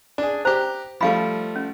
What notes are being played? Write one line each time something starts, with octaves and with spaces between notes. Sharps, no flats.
D4 G#4 A5
G4 C5 A#5
F3 G3 A3 F5 B5
C#4